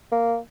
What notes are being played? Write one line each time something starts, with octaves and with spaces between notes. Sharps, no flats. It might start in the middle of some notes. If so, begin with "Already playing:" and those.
A#3